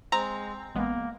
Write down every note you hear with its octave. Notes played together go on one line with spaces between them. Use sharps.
G#3 C4 A#5
A1 G#3 A#3 B3